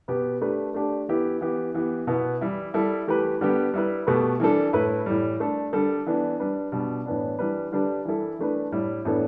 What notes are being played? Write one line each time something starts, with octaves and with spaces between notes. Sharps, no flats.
B2 B3 G4 B4
A3 D4 G4 B4
A3 D4 G4
E3 B3 E4 G4
E3 B3 G4
E3 B3 G4
B2 B3 E4
E3 G3 E4
G3 E4 A4
E3 A3 G4 B4
D3 G3 B3 G4
G3 E4 B4
B2 A3 G4 B4
E3 G3 D4 A4
A2 A3 E4 B4
A2 E3 G3
A3 D4 A4
D3 G3 D4 A4
E3 B3 D4
G3 D4 B4
B2 G3 D4
A2 E3 B3 D4
E3 G3 D4 B4
D3 G3 D4 G4 B4
E3 G3 E4 A4
E3 A3 D4 B4
A2 G3 E4
A2 E3 B3 D4 A4